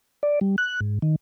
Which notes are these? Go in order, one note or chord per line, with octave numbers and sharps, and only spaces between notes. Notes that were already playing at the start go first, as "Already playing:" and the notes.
D5
G3
F#6
G#2
D#3